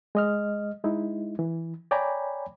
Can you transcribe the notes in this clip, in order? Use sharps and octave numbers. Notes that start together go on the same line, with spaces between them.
G#3 D#5 F6
G#3 D#4 E4
E3
C#5 D5 G5 G#5 A#5 B5